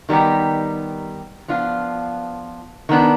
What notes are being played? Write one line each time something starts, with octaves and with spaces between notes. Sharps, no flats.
D#3 G3 B3 D#4 G4
F3 B3 D4 F4
D#3 B3 D4